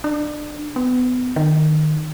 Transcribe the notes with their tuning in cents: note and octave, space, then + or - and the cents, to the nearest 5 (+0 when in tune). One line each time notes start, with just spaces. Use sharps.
D4 +25
B3 +25
D#3 -20